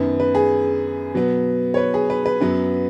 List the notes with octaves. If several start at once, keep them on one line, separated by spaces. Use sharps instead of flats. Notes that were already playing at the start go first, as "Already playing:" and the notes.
Already playing: F#2 D#3 B3
B4
G#4
B2 F#3 B3
C#5
B4
G#4
B4
B4
F#2 F#3 B3